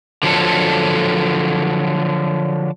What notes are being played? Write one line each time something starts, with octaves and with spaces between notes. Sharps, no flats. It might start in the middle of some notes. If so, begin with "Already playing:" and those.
D3 F3 F#3 A4